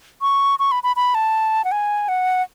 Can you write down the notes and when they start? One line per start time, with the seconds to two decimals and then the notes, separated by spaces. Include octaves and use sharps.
0.22 C#6
0.59 C#6
0.72 B5
0.83 B5
0.96 B5
1.15 A5
1.65 F#5
1.72 G#5
2.09 F#5